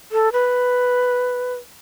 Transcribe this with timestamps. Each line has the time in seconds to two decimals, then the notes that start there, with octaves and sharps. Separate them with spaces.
0.12 A4
0.32 B4